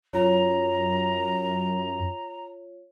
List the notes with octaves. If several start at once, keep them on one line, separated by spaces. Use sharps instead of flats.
F#2 F4 C#5 A#5